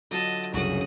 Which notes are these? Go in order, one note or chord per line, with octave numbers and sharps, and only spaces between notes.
D3 F#3 F4 D#5 A5
C2 F#2 C#3 F#4 D#6